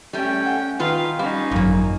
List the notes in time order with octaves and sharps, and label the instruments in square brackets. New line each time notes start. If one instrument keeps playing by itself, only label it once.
[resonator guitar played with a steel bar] G3 A3 [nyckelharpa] C#4 G5
[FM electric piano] F#5 G#5
[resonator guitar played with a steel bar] D#3 F4 B4 [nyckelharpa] F5
[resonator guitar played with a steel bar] G3 [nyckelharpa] C#4 D#4 [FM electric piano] F5
[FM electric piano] G#1 F#2 [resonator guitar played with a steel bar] A#2 A#3